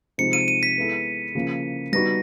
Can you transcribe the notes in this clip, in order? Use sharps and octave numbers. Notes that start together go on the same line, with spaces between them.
C3 F3 G#3 C4 D#4 C#7
D#7
D#7
B6
G#3 B3 E4 A4
C#3 F3 A#3
G3 B3 D#4 F#4 A#6